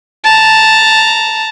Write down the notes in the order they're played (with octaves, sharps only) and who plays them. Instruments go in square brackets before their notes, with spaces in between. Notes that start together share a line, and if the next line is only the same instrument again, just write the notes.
[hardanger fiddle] A5 A#5